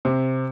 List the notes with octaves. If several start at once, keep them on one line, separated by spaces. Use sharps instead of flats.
C3